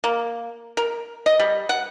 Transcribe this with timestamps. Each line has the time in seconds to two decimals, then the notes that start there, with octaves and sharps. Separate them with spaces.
0.04 A#3
0.77 A#4
1.26 D#5
1.40 G3
1.69 F#5